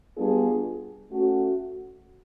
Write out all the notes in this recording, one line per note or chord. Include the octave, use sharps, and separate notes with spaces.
G3 B3 D4 F4 G#4
A3 C#4 F#4